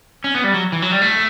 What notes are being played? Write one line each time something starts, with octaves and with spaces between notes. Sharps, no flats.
C#4
B3
G3
F#3
E3
F#3
G3
A3